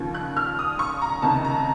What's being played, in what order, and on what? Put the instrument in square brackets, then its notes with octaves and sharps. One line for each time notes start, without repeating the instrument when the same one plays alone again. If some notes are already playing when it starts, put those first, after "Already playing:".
Already playing: [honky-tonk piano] D#2 C#3 F3
F#6
F6
D#6
C#6
A#5
C#2 C3 D#3 A5
A#5